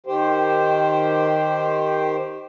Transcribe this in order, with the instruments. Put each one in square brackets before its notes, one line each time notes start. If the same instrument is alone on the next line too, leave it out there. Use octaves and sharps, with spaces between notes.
[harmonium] D#3 G4 C5